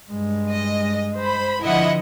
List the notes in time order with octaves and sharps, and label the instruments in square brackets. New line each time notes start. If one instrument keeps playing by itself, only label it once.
[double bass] G2 G#3
[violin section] D#5
C5 B5
[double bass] D3 F3 [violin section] E4 D#5 F#5